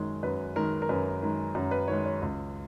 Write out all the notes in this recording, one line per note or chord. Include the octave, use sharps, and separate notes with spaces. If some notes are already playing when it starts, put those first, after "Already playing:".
Already playing: F#2 D#3 G#3
F#2 B4
D#3 G#3 A#4
A#4
F#2 B4
D#3 G#3
F#2
B4
D#3 G#3 C#5
C#5
C#2